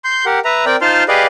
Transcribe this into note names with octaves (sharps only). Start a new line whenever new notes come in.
C6 G6
G4 A#4 F#5
B4 E5 A#5
C4 A#4 D5 G5
D#4 F4 C5 A5 C6 F6
G4 G#4 B4 D5 D#5 F5